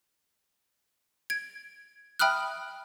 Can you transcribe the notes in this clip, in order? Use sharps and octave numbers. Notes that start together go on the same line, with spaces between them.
G#6 D7
E5 G5 B5 D#6 F6 F#6